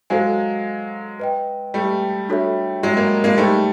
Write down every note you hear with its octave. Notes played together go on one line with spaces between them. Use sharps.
F#3 G#3 A4 C5 F5 G#5
B4 D#5 G5
G3 A3
D4 F#4 A4 C#5 E5
F#3 G#3
G#3 A#3
G#3 A#3
G3 A3 D#4 G#4 C5